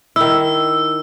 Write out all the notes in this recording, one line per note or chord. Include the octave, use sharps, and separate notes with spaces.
D#3 E4 E6